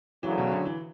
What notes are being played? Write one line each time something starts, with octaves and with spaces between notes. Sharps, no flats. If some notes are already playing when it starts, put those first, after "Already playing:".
D2 C#3 E3 F#3
B2
D3
E3